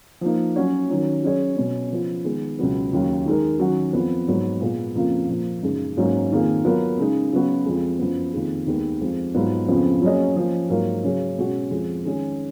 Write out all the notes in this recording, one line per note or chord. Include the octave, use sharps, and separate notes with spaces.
F3 A#3 D#4
F#3 C#4 F#4 C#5
D#3 F#3 C#4
F#3 C#4 G#4 C#5
B2 F#3 C#4
C#3 F3 B3 F4
D#3 G#3 B3
C#2 B2 F#3 B3
D#2 C#3 F#3
D#3 G#3 D#4 A#4
D#3 F#3 C#4 F#4
F2 F3 B3
G#2 F#3 B3
A#2 G#3 B3
F2 C#3 F3 A#3 F4
A#2 F3 A#3 F4
F#2 C#3 G#3 D#4 G#4
G#2 F#3 A#3 C#4 F#4
F2 D#3 A#3 F4 G#4
F#3 B3 F4 A#4
C#3 G#3 D#4
C#3 F#3 B3 F#4
F2 F3 G#3
F#2 F3 B3
F2 D#3 A#3 F4 G#4
D#2 D#3 G#3 B3
F2 F3 G#3
G#2 F#3 B3 F4
F2 C#3 F3 B3
F#3 A#3 C#4 G#4 D#5
F3 A#3 C#4
G#2 F#3 A#3 F4 A#4
C#3 F#3 C#4 G#4
B2 G#3 C#4 F#4
F2 F3 G#3
D#3 G#3 C#4 G#4